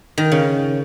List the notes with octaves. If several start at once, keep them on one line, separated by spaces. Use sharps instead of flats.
D#3
C#3